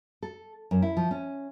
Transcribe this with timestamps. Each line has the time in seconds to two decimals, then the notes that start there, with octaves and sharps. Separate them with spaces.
0.22 A4
0.71 F#2
0.82 E4
0.97 F3
1.11 C#4